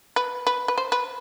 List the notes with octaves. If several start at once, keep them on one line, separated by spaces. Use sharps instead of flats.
B4
B4
B4
C5
B4